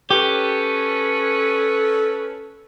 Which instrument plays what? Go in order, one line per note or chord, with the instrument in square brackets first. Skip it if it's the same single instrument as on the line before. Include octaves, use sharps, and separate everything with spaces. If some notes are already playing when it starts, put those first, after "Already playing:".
[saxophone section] C#4 B4 [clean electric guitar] G4 [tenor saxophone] A4